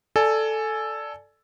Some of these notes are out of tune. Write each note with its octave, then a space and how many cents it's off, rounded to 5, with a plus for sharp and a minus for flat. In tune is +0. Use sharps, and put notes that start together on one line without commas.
A4 +0 D5 +0 G#5 +20